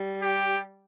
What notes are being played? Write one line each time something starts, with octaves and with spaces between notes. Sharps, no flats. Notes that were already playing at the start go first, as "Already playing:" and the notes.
Already playing: G3
G4